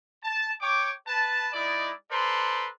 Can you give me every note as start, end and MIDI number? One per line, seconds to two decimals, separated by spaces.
0.24 0.51 81
0.61 0.92 73
0.61 0.92 79
0.61 0.92 85
0.61 0.92 86
1.07 1.48 71
1.07 1.48 81
1.53 1.91 56
1.53 1.91 63
1.53 1.91 64
1.53 1.91 74
2.10 2.68 69
2.10 2.68 71
2.10 2.68 72
2.10 2.68 74
2.10 2.68 82
2.10 2.68 84